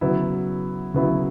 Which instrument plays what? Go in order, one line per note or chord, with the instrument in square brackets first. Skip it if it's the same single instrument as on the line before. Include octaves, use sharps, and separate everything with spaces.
[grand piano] C#3 F#3 B3 E4
C#3 F#3 B3 E4